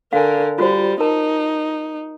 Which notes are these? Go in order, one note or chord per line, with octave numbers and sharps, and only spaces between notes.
D3 A#4 F5 G#5
G3 F4 F#4 C5
D#4 A#4 A5